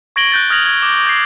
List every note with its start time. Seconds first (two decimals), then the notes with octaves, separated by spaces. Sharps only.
0.16 C#6 G#6 A#6 D7 F#7 G7
0.32 F#6 G6 A6
0.50 D#6 F6 G#6 A#6 F7 F#7
0.66 G#6
0.82 D6
1.06 G6 C7